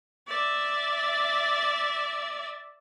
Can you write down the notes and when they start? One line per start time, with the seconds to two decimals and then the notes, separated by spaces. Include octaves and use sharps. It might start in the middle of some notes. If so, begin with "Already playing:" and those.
0.27 D5 E5